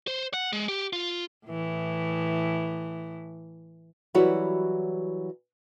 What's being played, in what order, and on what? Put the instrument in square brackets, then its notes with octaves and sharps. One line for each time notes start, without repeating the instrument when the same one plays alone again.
[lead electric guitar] C5
F#5
G#3
G4
F4
[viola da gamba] A2 E3
[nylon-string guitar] E3 F#3 G3 E4 F#4 C#5